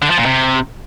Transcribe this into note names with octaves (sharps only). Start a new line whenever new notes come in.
D3
F3
A#2
C3